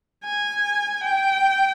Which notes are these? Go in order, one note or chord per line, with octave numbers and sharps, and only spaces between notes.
G#5
G5